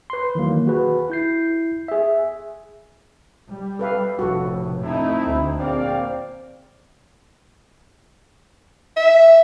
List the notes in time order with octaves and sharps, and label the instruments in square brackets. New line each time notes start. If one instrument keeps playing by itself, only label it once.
[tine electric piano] B4 C6
D#3 E3 F#3 A#3
F#4 G#4 B4
E4 G6 C7
G#4 E5
[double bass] G3
[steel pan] A4 B4 F5
[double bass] F1 A2 [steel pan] F#4 A4
[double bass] A3 D#4 [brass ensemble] C4 E4
[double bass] D2
[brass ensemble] A#1 D5 F5 [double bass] C4
[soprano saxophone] E5